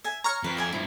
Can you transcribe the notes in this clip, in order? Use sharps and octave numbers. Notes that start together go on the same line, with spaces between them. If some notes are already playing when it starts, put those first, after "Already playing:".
E5 G#5
C#5 A#5 C#6 F6
F2 B4
D5 E5 G#5
G2 F3 E4